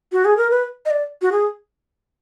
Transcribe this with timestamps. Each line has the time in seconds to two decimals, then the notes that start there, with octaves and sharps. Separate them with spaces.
0.12 F#4
0.25 G#4
0.37 A#4
0.51 B4
0.86 D#5
0.90 D5
1.22 F#4
1.32 G#4